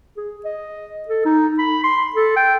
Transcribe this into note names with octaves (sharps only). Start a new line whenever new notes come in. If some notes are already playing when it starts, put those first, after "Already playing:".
G#4
D#5
A4
D#4
B5
C6
A4
G5